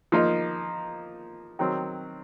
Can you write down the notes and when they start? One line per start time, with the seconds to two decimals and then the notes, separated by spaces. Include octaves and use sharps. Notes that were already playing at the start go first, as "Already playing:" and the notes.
0.12 F3 A#3 D#4
1.59 D#3 F#3 C4